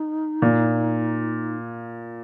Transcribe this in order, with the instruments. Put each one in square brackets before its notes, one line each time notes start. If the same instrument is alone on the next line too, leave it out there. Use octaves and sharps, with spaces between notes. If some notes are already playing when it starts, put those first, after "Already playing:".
Already playing: [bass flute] D#4
[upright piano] A#2